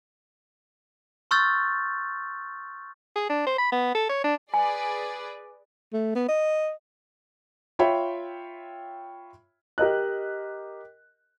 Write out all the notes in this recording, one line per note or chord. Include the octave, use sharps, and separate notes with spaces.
C6 C#6 E6 F6 G6 A6
G#4
D4
C5
B5
B3
A4
C#5
D4
G#4 B4 D5 G#5
A3
B3
D#5
F4 C#5 E5 G5 B5
G4 A#4 D#5 F#6